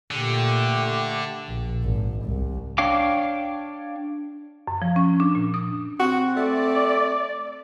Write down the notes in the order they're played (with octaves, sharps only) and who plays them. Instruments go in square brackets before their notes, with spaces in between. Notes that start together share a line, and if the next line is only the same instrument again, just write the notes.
[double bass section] A#2 [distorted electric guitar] D3 [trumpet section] A3 G4
[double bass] A#1
G#1
C2
[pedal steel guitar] D4 C#5 F5 G5 D6
[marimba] F#2
F3
C#4
D4
A#2
D#6
[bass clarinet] C4 [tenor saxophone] F#4
[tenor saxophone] A3 [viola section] D5